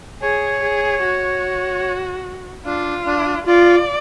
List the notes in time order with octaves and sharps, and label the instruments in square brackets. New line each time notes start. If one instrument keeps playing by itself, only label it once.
[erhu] G#4 [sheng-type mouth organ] C#5
[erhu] G#4
F#4
[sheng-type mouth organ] D4 [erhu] F4
[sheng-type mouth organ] D4
[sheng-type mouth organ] F4 [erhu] D5